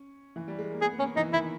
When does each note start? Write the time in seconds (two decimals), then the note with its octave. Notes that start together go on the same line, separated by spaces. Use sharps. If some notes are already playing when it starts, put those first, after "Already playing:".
Already playing: C#4
0.36 E3
0.48 G3
0.59 G#3
0.71 A#3
0.81 B3 G#4
0.93 B3
0.99 A#3 C#4
1.16 E3 D#4
1.33 D#3 E4